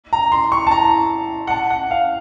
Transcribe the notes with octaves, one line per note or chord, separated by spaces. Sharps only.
A#5
C6
C#6
A5
A#5
F#5
A5
F#5
F5